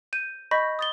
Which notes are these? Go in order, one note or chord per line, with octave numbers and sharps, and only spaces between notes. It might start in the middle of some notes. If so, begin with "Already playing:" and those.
G6 D#7
D#5 B5 C#6 G6 A#6 B6
D#6 A6 G7